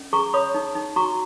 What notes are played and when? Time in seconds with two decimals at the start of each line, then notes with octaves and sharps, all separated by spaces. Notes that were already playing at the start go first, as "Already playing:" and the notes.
Already playing: C#4
0.13 G#4 A#5 C#6
0.33 C#5 B5 D#6
0.55 D#4
0.75 D#4
0.96 F#4 A#5 C#6